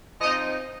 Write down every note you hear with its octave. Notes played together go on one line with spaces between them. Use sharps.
F3 C4 D#4 D#5